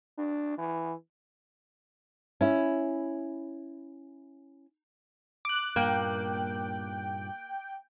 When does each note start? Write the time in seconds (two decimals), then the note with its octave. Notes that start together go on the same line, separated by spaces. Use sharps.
0.18 D4
0.58 E3
2.41 C#4 E4
5.45 D6 F#6
5.76 G2 A#2 A#3 G5